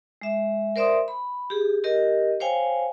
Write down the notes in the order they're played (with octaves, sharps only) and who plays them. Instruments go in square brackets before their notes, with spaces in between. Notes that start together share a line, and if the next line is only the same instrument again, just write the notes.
[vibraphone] G#3 E5
A#4 C5 D5 E5 C6 D#6
B5
G4 G#4
G4 A#4 D#5
C5 C#5 F5 G5 G#5